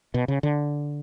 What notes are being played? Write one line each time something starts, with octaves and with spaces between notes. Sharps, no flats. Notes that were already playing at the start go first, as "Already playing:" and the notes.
B2
C#3
D3